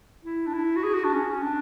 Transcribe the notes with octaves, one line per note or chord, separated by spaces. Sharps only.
E4
D4
E4
F#4
G#4
F#4
D4
C#4
D4